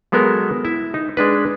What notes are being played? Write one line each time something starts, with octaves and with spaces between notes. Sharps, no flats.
F#3 G#3 B3 A4 A#4
E4 E5
D#4
G#3 D4 B4